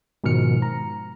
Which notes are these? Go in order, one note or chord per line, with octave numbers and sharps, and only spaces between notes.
G#2 B2 D#3 F3 F6 C#7
A#5